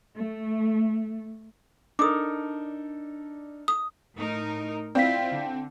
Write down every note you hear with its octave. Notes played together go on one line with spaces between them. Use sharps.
A3
D4 D#4 A4 A#4 D6 D#6
D#6
A2 D#4 A#4
C4 E4 F4 D5 F5 B6
D3